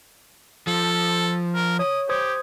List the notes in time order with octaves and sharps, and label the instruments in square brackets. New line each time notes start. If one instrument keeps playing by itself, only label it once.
[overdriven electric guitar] F3 [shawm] A4
[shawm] A#4
[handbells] C#5 [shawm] D#6
[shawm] G4 [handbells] C5 D#6 G#6